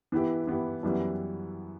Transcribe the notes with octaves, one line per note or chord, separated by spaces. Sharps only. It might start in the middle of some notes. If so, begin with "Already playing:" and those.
E3 B3 E4 G4
E3 B3 E4 G4
F#2 E3 G3 B3 E4